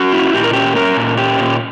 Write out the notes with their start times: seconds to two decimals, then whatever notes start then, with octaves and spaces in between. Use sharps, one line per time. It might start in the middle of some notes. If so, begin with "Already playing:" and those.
Already playing: C#4 F#4
0.13 E4
0.34 A#2 G4
0.44 A#4
0.53 C#4 G4
0.76 C#4 A#4
0.97 A#2
1.17 C#4 G4
1.39 A#2